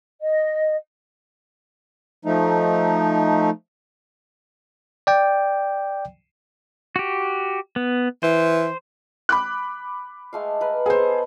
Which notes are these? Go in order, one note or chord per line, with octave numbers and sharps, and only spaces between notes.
D#5
F3 A3 D#4
D5 G5
F#4 G4
B3
E3 C5
B5 D6 F#6
G#3 A3 F5
A#4 B4
B3 G#4 A4 C5 D#5